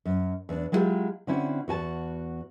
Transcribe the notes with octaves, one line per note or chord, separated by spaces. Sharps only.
F#2
E2 D4
F#3 G#3 B3 E4 F4 G4
D3 C4 C#4 E4 F#4
E2 F#4 G#5 A5